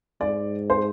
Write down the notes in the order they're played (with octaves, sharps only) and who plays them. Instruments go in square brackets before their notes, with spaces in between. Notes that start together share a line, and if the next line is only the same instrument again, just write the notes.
[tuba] G#2 [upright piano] D5
[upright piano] C5